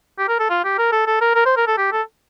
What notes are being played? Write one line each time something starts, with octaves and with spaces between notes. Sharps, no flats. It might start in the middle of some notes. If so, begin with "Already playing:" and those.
G4
A#4
A4
F4
G4
A#4
A4
A4
A#4
A#4
C5
A#4
A4
G4
A4